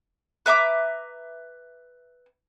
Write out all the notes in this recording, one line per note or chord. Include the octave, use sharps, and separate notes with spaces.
B4 E5 A#5 D6